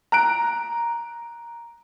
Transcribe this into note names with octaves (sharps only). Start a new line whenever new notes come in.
A#5 F#6 D7